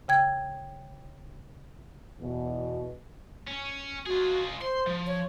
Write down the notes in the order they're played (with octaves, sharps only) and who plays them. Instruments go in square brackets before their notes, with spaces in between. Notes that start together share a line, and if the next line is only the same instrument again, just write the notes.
[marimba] C#3 G5 G#6
[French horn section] E2 B2
[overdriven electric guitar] C#4
[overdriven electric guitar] F4 G#4 [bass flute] F#4
[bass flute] C5 [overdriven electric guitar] C6
[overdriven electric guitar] F3
[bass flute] C#5